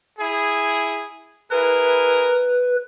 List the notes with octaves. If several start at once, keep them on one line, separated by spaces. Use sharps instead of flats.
E4 G#4
E4 G#4 A#4 B4